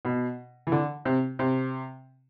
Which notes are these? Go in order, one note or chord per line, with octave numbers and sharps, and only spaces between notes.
B2
E3
D3
C3
C3